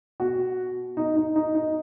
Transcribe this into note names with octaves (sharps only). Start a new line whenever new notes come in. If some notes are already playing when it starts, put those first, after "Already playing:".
B2 F#4
B2 D#4
D#4
D#4
D#4